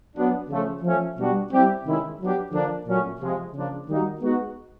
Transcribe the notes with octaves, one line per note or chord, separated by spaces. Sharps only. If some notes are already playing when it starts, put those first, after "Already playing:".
F#3 B3 D4
C#3 F3 A3
F3 A3 C#4
B2 G3 B3 D4 F#4
G3 C4 E4 G4
C3 D#3 G#3 C#4 E4
F#3 B3 D4 G4
D3 F3 A#3 D4
A#2 F#3 A3 C#4
C3 F3 G#3
C#3 F3 A#3 D4
D#3 G3 A#3 D#4 F#4
G#3 B3 D#4 F#4